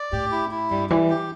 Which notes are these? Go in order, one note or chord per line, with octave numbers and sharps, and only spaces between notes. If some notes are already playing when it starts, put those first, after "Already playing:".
Already playing: D5
A2 G4
E4
E4
G2 G3
E3 G3
G4